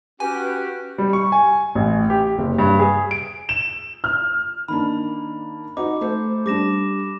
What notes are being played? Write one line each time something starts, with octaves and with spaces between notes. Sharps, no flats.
C#4 F#4 G4 B4 G#5
G3
C#6
G#5
A1
G4
F#1
G2
G#4
D7
E7
F6
D#3 A#3 D4 B5
D#4 F#4 D6
A3 C5
G3 D4 D6 A#6 E7